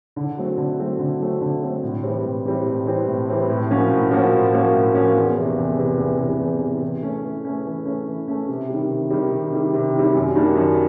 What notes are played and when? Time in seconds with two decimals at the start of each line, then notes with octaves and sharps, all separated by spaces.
0.16 D3
0.38 F#3 A3 C4
0.57 D3
0.79 F#3 A3 C4
0.99 D3
1.20 F#3 A3 C4
1.41 D3
1.62 F#3 A3 C4
1.83 A2
2.03 E3 G3 C4
2.25 A2
2.45 E3 G3 C4
2.65 A2
2.86 E3 G3 C4
3.08 A2
3.29 E3 G3 C4
3.50 A2
3.71 F3 A#3 C#4 F#4
3.90 A2
4.11 F3 A#3 C#4 F#4
4.32 A2
4.54 F3 A#3 C#4 F#4
4.74 A2
4.95 F3 A#3 C#4 F#4
5.16 E2
5.37 C3 E3
5.58 E2
5.79 C3 E3
5.99 E2
6.20 C3 E3
6.40 E2
6.61 C3 E3
6.83 E3
7.03 A3 C#4
7.24 E3
7.45 A3 C#4
7.65 E3
7.86 A3 C#4
8.08 E3
8.28 A3 C#4
8.48 C3
8.69 D#3 G3
8.90 C3
9.10 D#3 G3
9.32 C3
9.53 D#3 G3
9.74 C3
9.94 D#3 G3
10.15 F#2
10.35 D#3 G3 A#3 D4
10.57 F#2